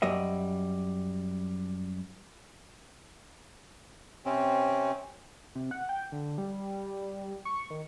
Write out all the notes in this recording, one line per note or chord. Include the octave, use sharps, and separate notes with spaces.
F#2 F#3 G3 D#5 E5
C3 C4 C#4
C3
F#5
G5
D3
G3
C#6
D#3